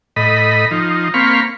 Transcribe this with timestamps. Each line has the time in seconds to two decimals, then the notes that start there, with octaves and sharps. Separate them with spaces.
0.16 A2 D#5 B5
0.71 F3 D#4
1.14 A#3 C4 F5 B5 C#6